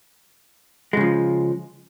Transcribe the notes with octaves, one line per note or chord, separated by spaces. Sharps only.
C#3 F3 G#3